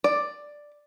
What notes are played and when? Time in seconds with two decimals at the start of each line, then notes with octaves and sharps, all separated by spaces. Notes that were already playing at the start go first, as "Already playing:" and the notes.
0.04 D5